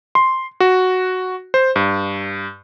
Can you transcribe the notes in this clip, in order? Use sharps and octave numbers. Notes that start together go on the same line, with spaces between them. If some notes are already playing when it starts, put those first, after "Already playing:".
C6
F#4
C5
G2